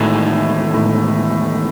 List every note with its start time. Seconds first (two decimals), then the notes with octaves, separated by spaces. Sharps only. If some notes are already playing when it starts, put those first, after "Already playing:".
Already playing: E2 A2 D#3 G#3 D#4 F#4
0.74 A2